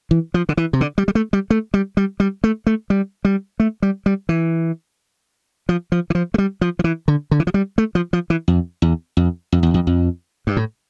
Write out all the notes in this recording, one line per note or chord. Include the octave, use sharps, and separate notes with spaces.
E3
F3
D3
E3
C3
D3
G3
G3
A3
G3
A3
G3
G3
G3
A3
A3
G3
G3
A3
G3
G3
E3
F3
F3
E3
F3
A3
G3
F3
F3
E3
D3
D3
E3
F3
G3
A3
F3
F3
E3
F2
E2
F2
F2
E2
F2
F2
G2
A2